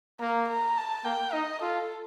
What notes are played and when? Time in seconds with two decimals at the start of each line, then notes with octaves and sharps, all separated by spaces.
0.20 A#3 A#5
0.48 A#5
0.77 A5
1.05 A#3 G5
1.33 D#4 D#5
1.62 F4 A4